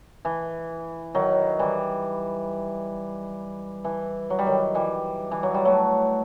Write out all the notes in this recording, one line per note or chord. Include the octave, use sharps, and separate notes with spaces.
E3
D#3 F#3
E3 G3
E3
F#3
G3
D#3 F#3
E3 G3
E3
F#3
G3
F#3 A3